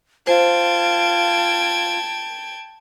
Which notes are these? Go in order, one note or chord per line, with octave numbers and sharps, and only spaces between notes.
F4 C5 G5 A5 G#6